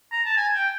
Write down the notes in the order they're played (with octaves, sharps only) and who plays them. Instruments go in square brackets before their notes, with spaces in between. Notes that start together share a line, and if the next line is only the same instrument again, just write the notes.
[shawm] A#5
A5
G#5
G5